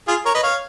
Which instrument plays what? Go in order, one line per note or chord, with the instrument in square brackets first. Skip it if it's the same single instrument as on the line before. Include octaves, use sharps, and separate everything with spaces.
[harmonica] F4 G#4
A#4 C#5
B4 D#5
C#5 F5